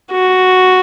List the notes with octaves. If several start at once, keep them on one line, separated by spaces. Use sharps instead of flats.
F#4